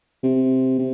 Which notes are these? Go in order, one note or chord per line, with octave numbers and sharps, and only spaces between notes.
C3
C3